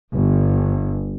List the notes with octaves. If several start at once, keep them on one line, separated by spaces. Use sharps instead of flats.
G1